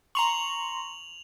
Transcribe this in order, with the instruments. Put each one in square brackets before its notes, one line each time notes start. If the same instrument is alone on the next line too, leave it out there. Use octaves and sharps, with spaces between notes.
[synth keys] A#5 C6 C#6 [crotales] F7 F#7